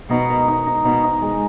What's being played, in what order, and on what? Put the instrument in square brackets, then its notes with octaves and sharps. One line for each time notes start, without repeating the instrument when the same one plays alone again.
[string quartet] B2 [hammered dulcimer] D#4
[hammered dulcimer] A#4
D#4
D#4
[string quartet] B2 [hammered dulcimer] D#4
[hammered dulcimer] D#4
G#3